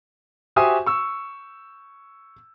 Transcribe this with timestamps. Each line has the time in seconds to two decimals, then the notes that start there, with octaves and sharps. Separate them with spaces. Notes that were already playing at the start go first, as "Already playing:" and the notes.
0.56 F#4 G4 C5 E5 G#5 D#6
0.86 C#6 E6